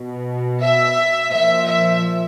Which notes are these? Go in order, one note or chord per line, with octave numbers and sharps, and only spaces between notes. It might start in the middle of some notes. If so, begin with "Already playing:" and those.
Already playing: B2
E5
A#2 F3 E5
E5